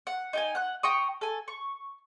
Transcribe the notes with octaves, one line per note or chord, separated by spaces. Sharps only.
F#5
D#4 G5 G#5
F#5 F#6
G5 A#5 C#6 D#6
A4 G#5
C#6